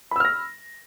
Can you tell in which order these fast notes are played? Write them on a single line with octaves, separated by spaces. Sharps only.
B5 E6 F6 A#6